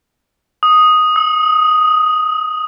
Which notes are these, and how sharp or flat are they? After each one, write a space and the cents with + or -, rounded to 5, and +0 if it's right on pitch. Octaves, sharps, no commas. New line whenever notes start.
D#6 +0
D#6 +45